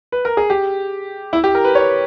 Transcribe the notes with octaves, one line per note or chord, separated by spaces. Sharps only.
B4
A#4
G#4
G4
E4
G4
A#4
B4
C#5